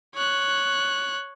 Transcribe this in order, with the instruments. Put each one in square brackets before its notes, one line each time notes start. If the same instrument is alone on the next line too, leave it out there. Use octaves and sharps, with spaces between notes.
[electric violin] C#5 F#6